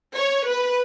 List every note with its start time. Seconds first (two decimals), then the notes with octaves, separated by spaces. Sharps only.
0.16 C#5
0.47 B4